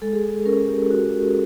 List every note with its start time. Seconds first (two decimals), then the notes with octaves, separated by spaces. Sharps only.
0.02 G#3 A4
0.13 G#4
0.24 A4
0.45 C#4 A#4
0.68 G4
0.91 C#4 F#4